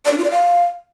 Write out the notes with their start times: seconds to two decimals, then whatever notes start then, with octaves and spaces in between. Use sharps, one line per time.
0.05 D5
0.12 D4
0.18 F4
0.24 D5
0.30 F5